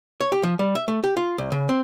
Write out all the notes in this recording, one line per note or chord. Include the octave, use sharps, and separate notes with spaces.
C#5
G4
F3
G3
E5
A3
G4
F4
C2
C#3
C4